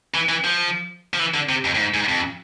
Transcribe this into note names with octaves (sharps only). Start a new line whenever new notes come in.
E3
E3
F3
F3
E3
D3
C3
F2
A2
G#2
G#2
F2